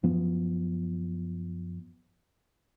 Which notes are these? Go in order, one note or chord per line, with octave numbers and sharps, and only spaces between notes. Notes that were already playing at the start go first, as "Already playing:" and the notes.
F#2 F3 B3